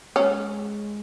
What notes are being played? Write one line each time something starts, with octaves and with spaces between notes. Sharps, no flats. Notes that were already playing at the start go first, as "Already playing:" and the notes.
G#3 C#4